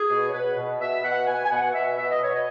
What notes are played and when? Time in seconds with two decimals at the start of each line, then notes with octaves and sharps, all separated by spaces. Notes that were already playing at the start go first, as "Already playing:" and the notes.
Already playing: G#4
0.10 B2
0.29 C#5
0.33 B2 B4
0.57 B2
0.80 B2 E5
1.03 B2 F#5
1.27 B2 G#5
1.44 G#5
1.50 B2 F#5
1.73 B2 E5
1.97 B2 E5
2.09 D#5
2.20 B2 C#5
2.35 D#5